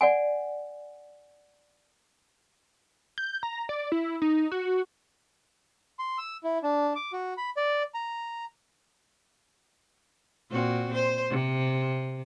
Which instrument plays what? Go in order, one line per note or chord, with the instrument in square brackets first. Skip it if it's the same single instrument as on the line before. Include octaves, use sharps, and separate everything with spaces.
[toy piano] D5 F#5 G#5
[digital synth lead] G6
A#5
D5
E4
D#4
F#4
[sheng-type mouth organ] C6
E6
E4
D4
D6
F#4
B5
D5
A#5
[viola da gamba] A#2 C4 F#4
C5
C3